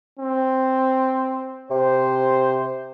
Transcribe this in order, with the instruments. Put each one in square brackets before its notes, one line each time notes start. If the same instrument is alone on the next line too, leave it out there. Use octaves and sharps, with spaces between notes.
[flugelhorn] C4
[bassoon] C3 [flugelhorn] C5